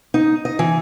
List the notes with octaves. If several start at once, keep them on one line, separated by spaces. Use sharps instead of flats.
D#4
D#5
E3